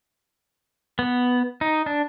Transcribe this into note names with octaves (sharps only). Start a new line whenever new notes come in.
B3
D#4
D4